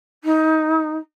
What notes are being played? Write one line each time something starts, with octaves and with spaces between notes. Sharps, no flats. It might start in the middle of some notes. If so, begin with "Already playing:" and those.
D#4